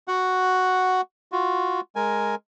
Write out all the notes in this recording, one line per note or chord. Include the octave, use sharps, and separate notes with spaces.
F#4 F#5
F4 F#4
G#3 A#4 G#5